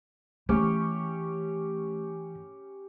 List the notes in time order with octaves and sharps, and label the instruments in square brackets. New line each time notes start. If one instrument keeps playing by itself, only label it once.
[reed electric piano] E3 [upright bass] A3 [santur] C#4 G4 C#5